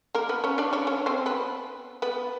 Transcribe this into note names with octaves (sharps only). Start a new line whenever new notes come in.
A#3 A#4
B3 B4
C#4 C#5
D4 D5
C#4 C#5
C#4 C#5
C4 C5
B3 B4
B3 B4